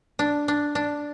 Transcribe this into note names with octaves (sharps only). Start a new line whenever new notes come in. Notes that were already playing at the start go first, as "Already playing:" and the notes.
D4
D4
D4